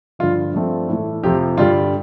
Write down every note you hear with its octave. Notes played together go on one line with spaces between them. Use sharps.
G2 D3 F3 F4
G2 F3 A3 C4
A2 E3 A3
F2 C3 F3 G4
G2 D3 G3 F4